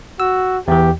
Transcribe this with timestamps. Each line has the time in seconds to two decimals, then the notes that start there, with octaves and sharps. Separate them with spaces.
0.20 F#4 E6
0.68 E2 E3 G4